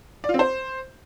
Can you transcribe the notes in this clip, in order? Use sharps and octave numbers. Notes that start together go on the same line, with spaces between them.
D5
F4
C4
C5